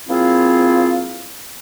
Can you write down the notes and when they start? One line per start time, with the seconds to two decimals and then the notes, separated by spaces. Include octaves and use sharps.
0.08 F3 A#3 C4 E4 F4 G#4